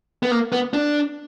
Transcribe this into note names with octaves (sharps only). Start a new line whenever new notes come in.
B3
A#3
B3
D4